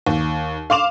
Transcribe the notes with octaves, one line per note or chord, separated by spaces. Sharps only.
D#2
F5 C6 D6 E7 F7